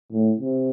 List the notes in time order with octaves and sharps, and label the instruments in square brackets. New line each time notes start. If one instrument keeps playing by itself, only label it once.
[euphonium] A2
C3